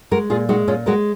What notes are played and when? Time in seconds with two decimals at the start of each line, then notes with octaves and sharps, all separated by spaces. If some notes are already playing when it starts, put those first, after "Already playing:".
0.11 G#3 F#4 A#4
0.30 A#2 F4 G#4
0.49 G#3 D#4 F#4
0.68 A#2 C#4 F4
0.86 G#3 F#4 A#4